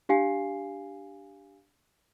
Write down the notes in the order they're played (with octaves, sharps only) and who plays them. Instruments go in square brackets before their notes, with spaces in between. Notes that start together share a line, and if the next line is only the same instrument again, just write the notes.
[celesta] D4 G4 F5 G#5 C7